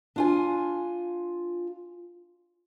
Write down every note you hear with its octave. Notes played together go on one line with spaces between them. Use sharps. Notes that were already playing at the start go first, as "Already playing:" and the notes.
D4 F4 G#5